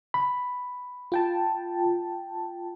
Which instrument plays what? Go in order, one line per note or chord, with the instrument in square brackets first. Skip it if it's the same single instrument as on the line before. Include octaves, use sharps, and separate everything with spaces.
[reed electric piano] B5
[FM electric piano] F4 G5 A5